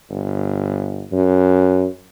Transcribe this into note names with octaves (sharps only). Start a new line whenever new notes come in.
G1
F#2